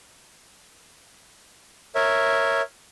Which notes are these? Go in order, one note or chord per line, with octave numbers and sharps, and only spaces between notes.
A#4 C#5 E5